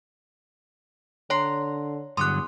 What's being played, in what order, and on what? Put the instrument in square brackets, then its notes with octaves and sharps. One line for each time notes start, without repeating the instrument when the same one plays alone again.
[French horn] D3 [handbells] C#5 [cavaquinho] A#5 C6
[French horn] E2 [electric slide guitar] G2 D3 F#3 [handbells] C6 D6 F#6 [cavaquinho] D#6